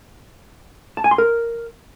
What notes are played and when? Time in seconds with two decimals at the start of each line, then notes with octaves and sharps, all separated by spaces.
0.97 A5
1.04 G#5
1.11 C6
1.18 A#4